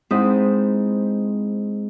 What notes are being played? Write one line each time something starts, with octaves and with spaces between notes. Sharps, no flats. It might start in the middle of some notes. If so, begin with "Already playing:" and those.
G#2 C4 E4 D#6